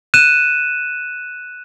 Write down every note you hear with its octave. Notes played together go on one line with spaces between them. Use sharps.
F#6 D#7 E7